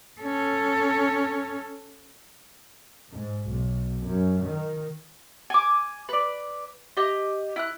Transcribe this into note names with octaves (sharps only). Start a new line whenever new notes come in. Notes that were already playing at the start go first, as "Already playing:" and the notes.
C#4 A4
G#2
B1
F#2
D#3
G#5 D6
B4 D5
G4 D#5
E4 F#6